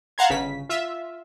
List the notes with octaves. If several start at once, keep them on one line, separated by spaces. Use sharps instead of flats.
F5 F#5 A5 A#5 C6 G#6
G1 C#3 B6
F4 E5